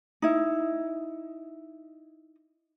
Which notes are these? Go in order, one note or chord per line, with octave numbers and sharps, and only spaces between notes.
D#4 E4